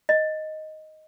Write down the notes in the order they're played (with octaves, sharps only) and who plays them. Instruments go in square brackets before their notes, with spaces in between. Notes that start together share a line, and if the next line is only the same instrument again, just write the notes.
[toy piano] D#5